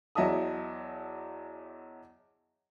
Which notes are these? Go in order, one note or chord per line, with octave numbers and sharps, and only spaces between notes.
E2 F#3 D#5 E5 A5 D#6